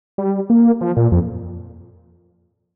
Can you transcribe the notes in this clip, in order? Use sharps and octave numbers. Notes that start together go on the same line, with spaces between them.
G3
A#3
F3
A#2
F2